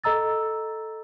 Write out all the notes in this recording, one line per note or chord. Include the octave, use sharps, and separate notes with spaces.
A4 D#5 A#5 E6 A6